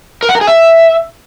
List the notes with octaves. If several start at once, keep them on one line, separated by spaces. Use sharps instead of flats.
A#4
F#5
A#4
G#4
E5